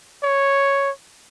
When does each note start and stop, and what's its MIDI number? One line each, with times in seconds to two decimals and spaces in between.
0.23 0.91 73